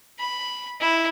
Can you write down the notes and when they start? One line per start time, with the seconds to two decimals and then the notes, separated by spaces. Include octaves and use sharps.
0.19 B5
0.81 E4